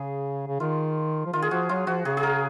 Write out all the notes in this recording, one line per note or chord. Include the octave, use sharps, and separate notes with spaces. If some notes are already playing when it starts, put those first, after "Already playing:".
Already playing: C#3 G#4
C#3
D#3 F4
F3
D#3 F4
G#4
F3 F#4
F#3 F4
F3 F#4
C#3 G#4
G#4
A#4